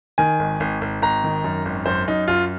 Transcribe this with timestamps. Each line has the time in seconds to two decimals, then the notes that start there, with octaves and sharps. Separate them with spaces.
0.18 D#3 G#5
0.39 G#1
0.60 G#1
0.81 G#1
1.02 G#1 A#5
1.24 D#3
1.44 F#2
1.65 G#1
1.86 F#2 C5
2.07 F#2 D#4
2.28 F#2 F4